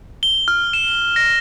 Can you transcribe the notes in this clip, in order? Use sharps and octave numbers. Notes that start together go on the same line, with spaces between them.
G7
F6
E7
A#6